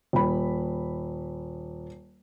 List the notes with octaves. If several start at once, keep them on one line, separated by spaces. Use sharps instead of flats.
D#1 B5